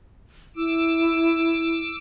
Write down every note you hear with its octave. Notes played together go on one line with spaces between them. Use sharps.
E4 D6 E6